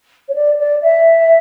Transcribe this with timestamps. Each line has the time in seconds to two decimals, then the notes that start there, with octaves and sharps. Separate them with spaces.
0.28 C#5
0.34 D5
0.59 D5
0.81 E5